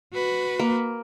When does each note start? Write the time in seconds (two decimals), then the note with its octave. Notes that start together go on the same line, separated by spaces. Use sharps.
0.13 F#4 B4
0.59 A#3